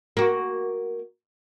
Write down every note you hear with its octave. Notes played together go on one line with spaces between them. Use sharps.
A#3 F#4